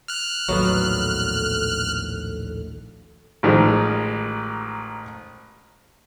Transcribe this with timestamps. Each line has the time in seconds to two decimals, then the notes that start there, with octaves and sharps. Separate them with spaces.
0.08 F6 F#6
0.48 A#1 D#2 A2 F#3 B3 A4
3.43 A1 D#3 F3 G#3